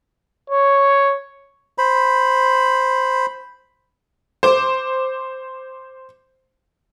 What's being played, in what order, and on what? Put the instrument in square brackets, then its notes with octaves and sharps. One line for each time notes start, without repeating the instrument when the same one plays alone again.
[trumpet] C#5
[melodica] C5 B5
[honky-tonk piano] C5 D6